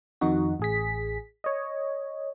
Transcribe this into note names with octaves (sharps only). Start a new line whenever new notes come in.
F2 D#3 D#4 F#4
A1 G#4 B6
C#5 D#5